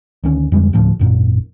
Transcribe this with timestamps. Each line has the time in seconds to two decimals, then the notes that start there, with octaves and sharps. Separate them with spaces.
0.24 D2 D#3 C#4
0.52 F2 D3 G3 G#3
0.73 D#1 D2 A2 F3
0.99 G#1 F#2 A#2